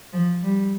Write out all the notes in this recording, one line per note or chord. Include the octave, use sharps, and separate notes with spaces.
F3
G3